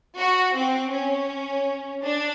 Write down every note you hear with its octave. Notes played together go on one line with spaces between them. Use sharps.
F#4
C4
C#4
D4